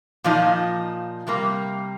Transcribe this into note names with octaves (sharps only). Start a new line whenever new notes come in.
A#2 F3 D#4
C3 G3 A#3